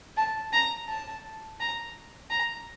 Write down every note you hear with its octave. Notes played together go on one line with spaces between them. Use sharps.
A5
A#5
A5
A#5
A#5